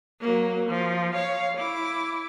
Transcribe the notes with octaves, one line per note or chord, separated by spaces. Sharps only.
F#3 A#3
F3
C#5 F5
E4 D6